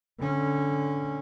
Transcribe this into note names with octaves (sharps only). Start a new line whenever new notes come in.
D3 C#4